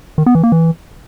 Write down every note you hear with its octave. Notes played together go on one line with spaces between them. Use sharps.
D#3
B3
E3
A#3
E3